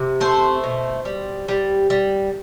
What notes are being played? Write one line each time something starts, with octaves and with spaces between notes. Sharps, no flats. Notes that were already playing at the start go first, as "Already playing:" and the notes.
Already playing: C3
A3 C5
B2
G3
G3
G3